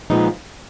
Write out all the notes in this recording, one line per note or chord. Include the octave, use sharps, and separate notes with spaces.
A#2 F3 G#3 B3 D#4